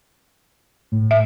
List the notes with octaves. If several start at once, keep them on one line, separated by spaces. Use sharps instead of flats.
A2
E5